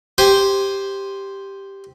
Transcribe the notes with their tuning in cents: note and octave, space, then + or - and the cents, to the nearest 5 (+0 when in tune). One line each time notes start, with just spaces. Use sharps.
G4 +0 C5 +0 G#5 +5